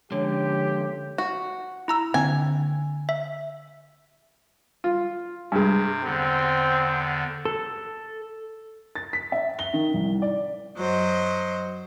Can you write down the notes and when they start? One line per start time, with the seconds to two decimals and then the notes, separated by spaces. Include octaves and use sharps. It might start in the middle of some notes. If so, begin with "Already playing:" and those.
0.12 D3 F3 G#3 C#4 G4 C#5
1.18 F#4
1.88 E4 A#5 E6
2.14 D3 A#3 C4 G#5
3.09 E5
4.84 F4
5.52 G2 C3 G#3
6.04 E2 D3 C4
7.45 A4
8.95 A6
9.13 B6
9.32 E5
9.59 G7
9.74 D#3
9.94 C2
10.22 D5
10.78 F#2 F#3 C5 D#5